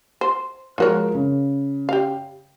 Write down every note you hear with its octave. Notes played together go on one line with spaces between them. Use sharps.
C5
F3 G#3 F4 F#4 A#4 C#5
C#3
G4 F5